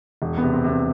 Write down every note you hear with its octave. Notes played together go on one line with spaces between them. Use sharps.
E1
B3
C3
C4
C3
B3